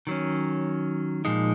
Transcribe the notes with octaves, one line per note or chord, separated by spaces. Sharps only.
D#3 F#3 C#4
A#2 F3 G#3 D#4